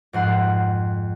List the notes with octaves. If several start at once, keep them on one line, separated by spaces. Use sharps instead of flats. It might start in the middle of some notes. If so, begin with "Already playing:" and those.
F2 G#2 F#5 C6